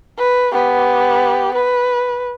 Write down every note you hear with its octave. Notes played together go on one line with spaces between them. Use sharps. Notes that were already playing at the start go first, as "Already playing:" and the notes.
B4
B3 G4
B4